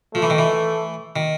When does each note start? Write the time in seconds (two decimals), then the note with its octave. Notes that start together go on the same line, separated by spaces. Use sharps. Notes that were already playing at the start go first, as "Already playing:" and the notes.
0.15 F3 A3
0.22 E3
0.30 D#3
0.38 E3
1.16 D#3